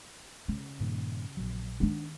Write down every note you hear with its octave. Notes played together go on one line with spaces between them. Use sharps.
C#3
G2 A#2 D#3
A#1 D#2 F#3
D#3 B3 D4